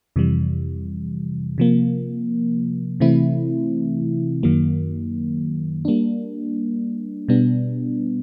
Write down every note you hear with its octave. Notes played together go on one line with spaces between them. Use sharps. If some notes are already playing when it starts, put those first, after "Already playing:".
F2 C3 E3 G3
C3 F3 A#3
C3 E3 A3 C4 E4
F#2 D#3 F#3 A#3
G3 A#3 D4
B2 G3 B3 D4